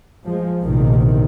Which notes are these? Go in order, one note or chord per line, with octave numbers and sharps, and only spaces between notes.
F3 G#3
A#1 E2 A2 C3 D#3